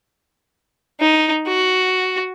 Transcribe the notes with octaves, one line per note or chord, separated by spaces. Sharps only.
D#4
F#4